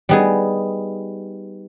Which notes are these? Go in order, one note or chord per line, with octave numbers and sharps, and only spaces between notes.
G3 B3 D#4 G#4